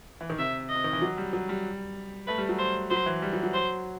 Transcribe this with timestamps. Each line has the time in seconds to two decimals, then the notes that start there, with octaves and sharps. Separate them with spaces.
0.21 E3
0.30 D#3
0.39 C3 E5
0.70 D#5
0.75 C3
0.84 D#3
0.93 E3
1.02 F#3
1.18 G3
1.33 F#3
1.49 G3
2.28 A3 B4
2.38 G3
2.49 F#3
2.59 C5
2.90 F#3 C5
3.06 E3
3.22 G3
3.33 F#3
3.43 F#3
3.54 C5